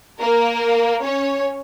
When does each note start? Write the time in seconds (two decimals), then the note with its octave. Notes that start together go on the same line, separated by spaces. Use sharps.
0.21 A#3 A#4
1.04 C#4 C#5